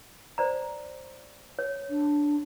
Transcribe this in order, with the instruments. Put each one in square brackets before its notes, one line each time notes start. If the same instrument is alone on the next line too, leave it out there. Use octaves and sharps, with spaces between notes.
[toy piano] C5 D5 A#5
C#5
[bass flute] D4